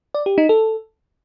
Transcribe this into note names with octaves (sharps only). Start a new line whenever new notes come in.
D5
G4
D#4
A4